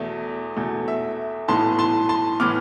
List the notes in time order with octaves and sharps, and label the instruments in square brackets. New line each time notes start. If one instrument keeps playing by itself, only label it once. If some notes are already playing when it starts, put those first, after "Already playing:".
Already playing: [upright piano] E2 B2 A3 E5
E2 B2 A3
E5
B1 A2 E3 B3 A5 C6
A5 C6
A5 C6
A2 E3 B3 D6 F6